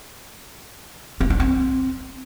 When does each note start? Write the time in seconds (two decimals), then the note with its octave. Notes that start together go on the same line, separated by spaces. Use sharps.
1.21 C4
1.30 D4
1.40 C4